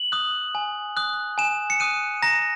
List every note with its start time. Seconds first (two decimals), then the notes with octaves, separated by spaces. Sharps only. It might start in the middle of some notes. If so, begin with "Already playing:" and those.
Already playing: F#7
0.12 D#6 F#6
0.55 G#5
0.97 D#6 F#6
1.38 G#5 E7
1.70 C#7
1.80 D#6 F#6 D#7
2.22 A#5 A#6